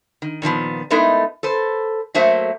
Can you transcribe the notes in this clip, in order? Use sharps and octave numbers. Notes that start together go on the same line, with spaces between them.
D#3
A#2 D#3 F3 B3
G#3 A3 B3 D#4 E4 A#4
A4 B4 C5
F#3 A3 A#3 C5 E5